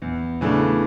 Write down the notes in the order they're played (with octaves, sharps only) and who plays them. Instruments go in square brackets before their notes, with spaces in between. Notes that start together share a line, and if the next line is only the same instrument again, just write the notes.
[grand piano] E2
C#3 E3 A3 D4